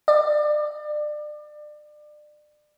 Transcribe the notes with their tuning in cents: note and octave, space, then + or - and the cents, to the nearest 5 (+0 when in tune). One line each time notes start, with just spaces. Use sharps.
D5 +30